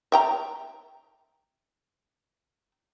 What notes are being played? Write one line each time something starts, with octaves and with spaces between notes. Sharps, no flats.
E5 G5 A#5